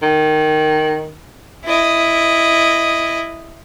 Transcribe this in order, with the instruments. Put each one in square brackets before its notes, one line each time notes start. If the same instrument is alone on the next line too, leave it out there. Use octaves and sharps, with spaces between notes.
[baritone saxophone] D#3
[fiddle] E4 D#5